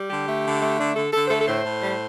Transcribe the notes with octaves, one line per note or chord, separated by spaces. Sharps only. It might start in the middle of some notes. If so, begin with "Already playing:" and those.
Already playing: G3
D3 G4
A3
D3
A3
D3 D4
D3 A4
D3 A4
C5
A3 A4
A4
A2 C5
A2
G3